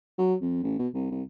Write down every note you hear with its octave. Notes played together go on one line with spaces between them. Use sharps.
F#3
F2
A1
B2
C2
C2